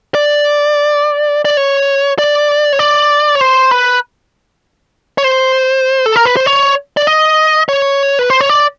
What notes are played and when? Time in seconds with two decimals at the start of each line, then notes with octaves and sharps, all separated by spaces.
0.15 D5
1.45 D5
1.57 C#5
2.19 D5
2.73 C#5
2.79 D5
3.35 C#5
3.41 C5
3.71 B4
5.18 C#5
5.24 C5
6.06 A4
6.16 A#4
6.26 B4
6.37 C5
6.46 C#5
6.97 D5
7.07 D#5
7.69 C#5
8.19 B4
8.30 C5
8.41 C#5
8.50 D5